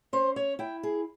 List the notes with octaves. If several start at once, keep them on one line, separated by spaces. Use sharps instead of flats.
C#4 C5
C#5
E4 G5
G#4